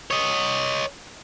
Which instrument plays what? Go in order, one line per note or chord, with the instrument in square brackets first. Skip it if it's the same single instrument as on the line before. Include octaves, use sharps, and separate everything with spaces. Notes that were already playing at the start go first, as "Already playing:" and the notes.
[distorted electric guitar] C#5 D#5